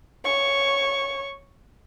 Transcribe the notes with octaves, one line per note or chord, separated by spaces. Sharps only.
C#5 C#6